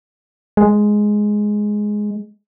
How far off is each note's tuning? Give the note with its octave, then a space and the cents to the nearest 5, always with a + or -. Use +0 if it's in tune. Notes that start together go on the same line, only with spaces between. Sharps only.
G#3 +5